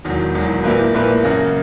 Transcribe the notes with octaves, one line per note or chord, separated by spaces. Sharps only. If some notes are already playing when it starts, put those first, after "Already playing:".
E1 E2 D#3 F#3
E1 E2 D#3 F#3
A#1 A#2 A#3 E4 B4
A#1 A#2 A#3 E4 B4
F#2 C#3 F#3 A#3